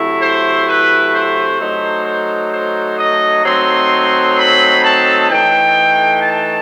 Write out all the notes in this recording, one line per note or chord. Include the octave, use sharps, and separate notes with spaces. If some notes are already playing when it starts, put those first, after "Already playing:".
Already playing: C3 F#3 A3 E4
C5
B4
C5
F#3 A3 D#4
C5
C5
D#5
F#3 A3 C4 D#4 C6
B5
A5
E3 A3 D#4 G5
A5